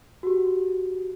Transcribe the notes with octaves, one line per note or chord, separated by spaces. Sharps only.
F#4 G4